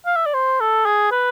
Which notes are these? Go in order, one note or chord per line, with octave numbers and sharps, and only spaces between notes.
F5
E5
D5
C5
A4
G#4
B4